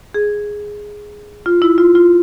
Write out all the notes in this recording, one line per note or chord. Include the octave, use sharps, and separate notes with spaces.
G#4
F4
E4
F4
F4